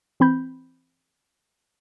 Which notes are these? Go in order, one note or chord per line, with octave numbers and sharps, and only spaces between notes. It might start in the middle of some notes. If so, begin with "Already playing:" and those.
E3 C4 B5 G6